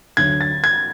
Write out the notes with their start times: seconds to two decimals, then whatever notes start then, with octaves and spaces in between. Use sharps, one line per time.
0.17 D2 D3 F#3 G#6
0.41 A6
0.64 G#6